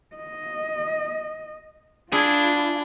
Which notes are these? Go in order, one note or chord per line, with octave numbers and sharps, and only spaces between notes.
D#5
D4 E4 F4 G#4